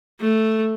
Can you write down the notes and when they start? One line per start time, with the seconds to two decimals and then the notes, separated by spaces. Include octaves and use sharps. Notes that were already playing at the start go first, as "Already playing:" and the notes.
0.20 A3